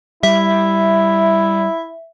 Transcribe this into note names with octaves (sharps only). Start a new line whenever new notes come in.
G3 E4 E5